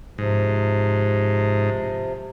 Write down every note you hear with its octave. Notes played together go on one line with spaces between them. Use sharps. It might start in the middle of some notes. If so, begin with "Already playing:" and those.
G#2 C3 F3